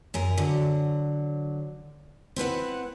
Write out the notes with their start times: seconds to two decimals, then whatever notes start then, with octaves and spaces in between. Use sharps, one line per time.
0.14 F#2 G#4 A#4
0.38 D3 F#3
2.36 C4 E4 B4 F#5